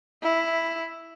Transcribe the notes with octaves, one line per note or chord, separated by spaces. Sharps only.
E4